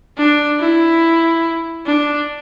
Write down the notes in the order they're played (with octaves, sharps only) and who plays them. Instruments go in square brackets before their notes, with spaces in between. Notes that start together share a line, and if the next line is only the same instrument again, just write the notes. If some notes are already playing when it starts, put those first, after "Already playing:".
[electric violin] D4
E4
D4